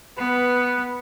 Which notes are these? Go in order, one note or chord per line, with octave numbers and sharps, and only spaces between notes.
B3 B4